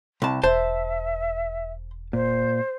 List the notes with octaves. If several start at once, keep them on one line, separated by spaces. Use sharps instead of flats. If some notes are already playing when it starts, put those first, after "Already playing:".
C2 A5
E1 C5 E5 A5
A#2 C5